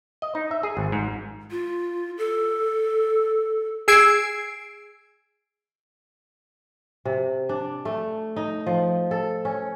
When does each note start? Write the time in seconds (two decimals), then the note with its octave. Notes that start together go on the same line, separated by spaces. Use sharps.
0.22 D#5
0.35 D#4
0.51 E5
0.63 G#4
0.77 G#1
0.92 G#2
1.51 F4
2.18 A4
3.88 G#4 E6 G#6 C7 D7
7.05 C3
7.49 D4
7.85 A3
8.36 D#4
8.66 F3
9.11 A4
9.45 C#4